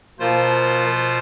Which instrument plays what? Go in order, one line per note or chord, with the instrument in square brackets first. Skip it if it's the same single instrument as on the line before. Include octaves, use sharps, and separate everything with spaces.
[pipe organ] B2 F4 C5 [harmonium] F3 A#3